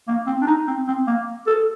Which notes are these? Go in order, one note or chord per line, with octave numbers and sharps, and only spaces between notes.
A#3
C4
D4
D#4
C4
C4
A#3
A4